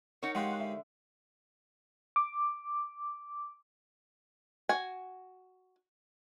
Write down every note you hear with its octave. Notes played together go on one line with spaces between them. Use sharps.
D#4 A#4 C#5 F#5
G#3 G4 F5 F#5 C6 F#6
D3 E5
D6
F#4 G#5